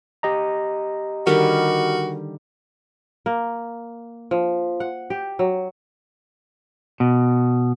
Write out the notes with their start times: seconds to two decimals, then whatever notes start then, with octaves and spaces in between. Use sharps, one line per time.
0.23 G4 D#5 A#5
1.27 D3 D#3 G3 F#4 A#4
3.26 A#3
4.31 F3
4.80 F#5
5.10 G4
5.39 F#3
7.00 B2